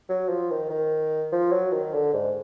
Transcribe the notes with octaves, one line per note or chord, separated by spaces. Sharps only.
F#3
F3
D#3
D#3
F3
F#3
D#3
D3
G#2